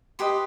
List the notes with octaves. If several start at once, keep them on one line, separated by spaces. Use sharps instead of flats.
G4 B4 D#5 C6